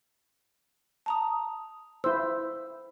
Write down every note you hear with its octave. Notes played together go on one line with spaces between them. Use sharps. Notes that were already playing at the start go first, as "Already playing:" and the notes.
A5 A#5 D#6
E4 C5 E6